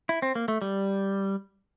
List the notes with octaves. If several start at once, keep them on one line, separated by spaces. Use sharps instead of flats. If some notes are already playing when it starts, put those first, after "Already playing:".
E4
C4
A#3
A3
G3